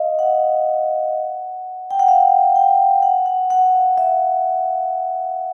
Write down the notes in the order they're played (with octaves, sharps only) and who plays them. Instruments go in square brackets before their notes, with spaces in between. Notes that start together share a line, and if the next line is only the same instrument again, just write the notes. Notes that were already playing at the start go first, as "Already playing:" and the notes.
Already playing: [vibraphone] D#5 F5
F#5
G5
F#5
F5
G5
F#5
F#5
F#5
F5
E5